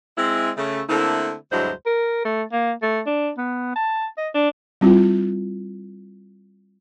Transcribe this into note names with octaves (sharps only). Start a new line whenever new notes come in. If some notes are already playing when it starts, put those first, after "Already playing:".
G#3 C4 E4
C#3 A3
D3 A3 A#3 C4 E4
D2 G2 F#3 G#3 E4 C5
A#4
A3
A#3
A3
D4
B3
A5
D#5
D4
G3 C4 E4 F4